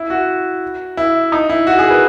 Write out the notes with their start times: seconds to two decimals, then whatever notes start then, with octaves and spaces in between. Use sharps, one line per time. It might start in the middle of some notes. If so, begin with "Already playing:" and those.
Already playing: E4
0.10 F#4
0.97 E4
1.32 D#4
1.50 E4
1.67 F#4
1.79 G#4
1.91 B4